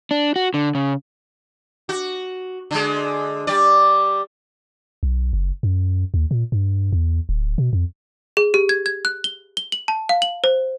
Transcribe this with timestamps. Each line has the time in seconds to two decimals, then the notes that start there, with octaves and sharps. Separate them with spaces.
0.11 D4
0.36 F#4
0.54 D3
0.75 C#3
1.89 F#4
2.71 D3 G#3
3.47 G3 D5
5.03 B1
5.33 F#1
5.63 F#2
6.14 D#2
6.31 A#2
6.52 G2
6.92 E2
7.29 D1
7.58 B2
7.73 F2
8.37 G#4
8.54 G4
8.69 G#6
8.86 G#6
9.05 F#6
9.24 G7
9.57 G7
9.72 F#7
9.88 A5
10.09 F5
10.22 F#7
10.44 C5